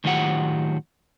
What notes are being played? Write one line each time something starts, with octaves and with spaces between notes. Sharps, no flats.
A2 D#3 F#3 F4 G4 F#5